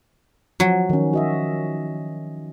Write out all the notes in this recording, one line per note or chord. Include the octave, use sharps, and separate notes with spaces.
F3 F#3
D#3 C#4
F#4 D#5 E5